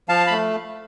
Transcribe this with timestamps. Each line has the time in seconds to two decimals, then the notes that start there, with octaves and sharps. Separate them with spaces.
0.09 F3 F5 A5
0.27 A3 B5